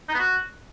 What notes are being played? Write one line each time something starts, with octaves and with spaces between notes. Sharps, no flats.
D#4
B3
F#4